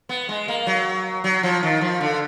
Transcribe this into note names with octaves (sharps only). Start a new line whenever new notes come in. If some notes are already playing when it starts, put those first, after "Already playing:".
B3
G#3
A#3
F#3
F#3
F3
D#3
F3
D3